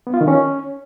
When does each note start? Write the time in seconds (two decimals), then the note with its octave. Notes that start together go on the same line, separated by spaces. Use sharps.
0.07 B3
0.14 F4
0.21 D#3
0.28 C#4